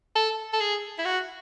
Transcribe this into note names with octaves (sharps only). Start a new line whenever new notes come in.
A4
A4
G#4
E4
F#4